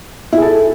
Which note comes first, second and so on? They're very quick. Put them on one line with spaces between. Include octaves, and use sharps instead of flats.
E4 G#4 A4